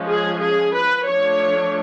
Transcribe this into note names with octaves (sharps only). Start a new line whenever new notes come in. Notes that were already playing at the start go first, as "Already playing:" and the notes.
Already playing: F3 G#3 C#4
G#4
G#4
B4
F3 A3 D4 C#5